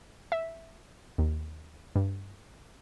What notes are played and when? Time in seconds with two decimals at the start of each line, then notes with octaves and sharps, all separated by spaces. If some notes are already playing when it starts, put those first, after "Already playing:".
0.32 E5
1.18 D#2
1.96 G2